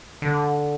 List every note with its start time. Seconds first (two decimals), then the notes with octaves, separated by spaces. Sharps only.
0.22 D3